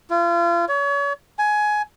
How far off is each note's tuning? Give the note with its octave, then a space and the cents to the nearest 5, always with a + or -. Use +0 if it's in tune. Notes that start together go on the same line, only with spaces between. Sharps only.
F4 -35
C#5 +35
G#5 +15